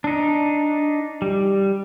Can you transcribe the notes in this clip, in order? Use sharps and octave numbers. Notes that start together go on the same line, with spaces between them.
D4 D#4
G3